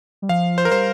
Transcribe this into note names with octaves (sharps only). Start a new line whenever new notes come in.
G3
F3 F5
C5
A#4
G3 C5